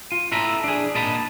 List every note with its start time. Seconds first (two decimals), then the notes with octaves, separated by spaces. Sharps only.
0.12 F4
0.32 B3 E4 A4 A#5 B5
0.64 D4 G#4
0.95 A#2 D#5 A5 B5